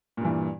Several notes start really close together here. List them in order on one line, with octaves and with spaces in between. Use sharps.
A#2 G2 E3